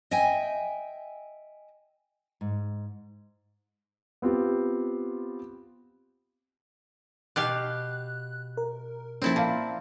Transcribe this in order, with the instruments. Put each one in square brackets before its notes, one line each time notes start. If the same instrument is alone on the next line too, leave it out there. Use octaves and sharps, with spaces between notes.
[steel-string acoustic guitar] D#5 E5 G5 G#5
[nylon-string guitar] G#2
[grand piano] B3 C4 F4 G4
[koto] B2 G4 F5 [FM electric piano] F#6
[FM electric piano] A#4
[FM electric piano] F3 A#3 C#4 [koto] C4 E4 A4
[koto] A#2 [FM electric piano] F5 A5